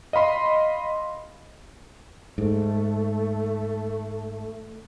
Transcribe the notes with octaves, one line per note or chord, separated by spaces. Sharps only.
D#5 F5 B5 C6
G#2 A3